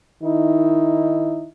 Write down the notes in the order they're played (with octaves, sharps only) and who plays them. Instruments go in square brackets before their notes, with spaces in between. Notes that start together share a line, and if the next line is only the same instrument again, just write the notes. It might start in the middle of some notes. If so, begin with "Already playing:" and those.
[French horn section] D#3 D#4 E4